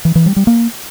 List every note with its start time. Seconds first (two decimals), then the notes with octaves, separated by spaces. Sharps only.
0.05 E3
0.15 E3
0.26 G3
0.36 G3
0.47 A#3